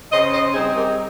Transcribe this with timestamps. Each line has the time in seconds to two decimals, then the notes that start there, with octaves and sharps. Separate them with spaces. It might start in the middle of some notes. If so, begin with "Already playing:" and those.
0.12 C#3 C5 D#5
0.33 C5 D#5
0.54 G3 C4 D#4 G#4 C5
0.75 G4 A#4